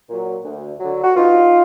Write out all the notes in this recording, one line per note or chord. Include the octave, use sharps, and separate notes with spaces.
A#2 F#3
D2
D3 F#3
F#4
G2 D#4 F4